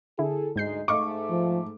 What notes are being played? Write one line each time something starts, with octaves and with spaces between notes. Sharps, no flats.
D3 E4 G#4 A4
D2 G#2 G#3 D#4 G6 C7
G#2 A3 D#5 F5 C#6 D6
F3